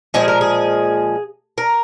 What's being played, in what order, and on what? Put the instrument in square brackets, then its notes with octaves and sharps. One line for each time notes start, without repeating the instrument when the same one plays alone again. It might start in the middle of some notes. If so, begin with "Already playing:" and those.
[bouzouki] A#2 F3 G#3 G#4
A#4
G#4
A#4